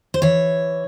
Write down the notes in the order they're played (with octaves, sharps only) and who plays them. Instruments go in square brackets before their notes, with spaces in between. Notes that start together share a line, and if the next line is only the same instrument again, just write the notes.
[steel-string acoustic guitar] C5
E3 C#5